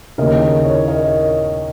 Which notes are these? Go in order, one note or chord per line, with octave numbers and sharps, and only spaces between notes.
D#2 C#3 A#4 D#5
A#4
C#5
A#4 D#5